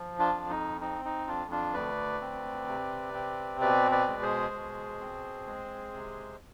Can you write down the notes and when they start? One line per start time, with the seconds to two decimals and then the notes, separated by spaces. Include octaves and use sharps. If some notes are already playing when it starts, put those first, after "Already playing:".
Already playing: F3
0.19 D4 F4
0.34 F2
0.49 D#4
0.81 C4 D#4
1.05 D#4
1.27 F2 D4 F4
1.51 D4 F4
1.74 D2 B4 D5
2.21 C4
2.68 C3
3.14 C4
3.60 B2 B4 D5
3.92 B4 D5
4.08 G#3
4.22 G#4 C5
4.54 B2
5.00 C4
5.47 G#3
5.93 C3